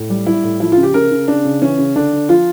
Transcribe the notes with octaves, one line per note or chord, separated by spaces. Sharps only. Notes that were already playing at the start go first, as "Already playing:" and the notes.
Already playing: A2
G3
G3 E4
A2
F3 E4
F4
C#3
G4
C#3 A#4
C#3
C#3 D4
C#3
E3 C#4
C#3
D3 D4
D3
F3 F4